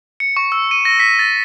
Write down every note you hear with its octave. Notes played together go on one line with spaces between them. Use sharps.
C#7
C#6
E6
D#7
A#6
B6
A6